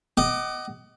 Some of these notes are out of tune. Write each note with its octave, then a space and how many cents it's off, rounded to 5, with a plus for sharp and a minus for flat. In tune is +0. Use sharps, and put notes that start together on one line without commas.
D#5 +0 F#5 +30 D6 +20